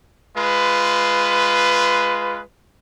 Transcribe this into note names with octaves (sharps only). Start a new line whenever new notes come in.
G#3 F4 B4